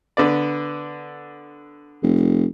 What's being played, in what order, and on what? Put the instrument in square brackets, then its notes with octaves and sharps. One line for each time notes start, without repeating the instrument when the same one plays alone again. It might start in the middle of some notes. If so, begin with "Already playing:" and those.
[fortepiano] D3 B3 D5
[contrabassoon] F1